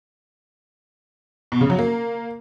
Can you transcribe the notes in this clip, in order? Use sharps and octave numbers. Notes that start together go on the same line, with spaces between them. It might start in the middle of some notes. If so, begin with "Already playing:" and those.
B2
C#3
F#3
A#3